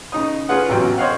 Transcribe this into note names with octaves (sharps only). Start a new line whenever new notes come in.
C#3 D#4 D#6
C#4 F4 G#4 B4 F#5
A1 E2 C3 F#3 F4 G5
C5 C#5 D#5 F5 F#5